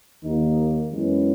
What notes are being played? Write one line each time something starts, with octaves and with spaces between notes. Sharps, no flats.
D#2 D#3 A#3 D#4
F#2 E3 G#3 B3 C#4